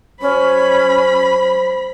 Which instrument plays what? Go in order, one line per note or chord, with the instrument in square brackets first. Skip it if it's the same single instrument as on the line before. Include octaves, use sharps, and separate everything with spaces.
[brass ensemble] F#3 C5 [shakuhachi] C#4 [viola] B5